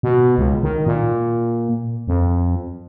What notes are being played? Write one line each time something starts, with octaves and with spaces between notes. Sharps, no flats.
B2
C#2
D#3
A#2
F2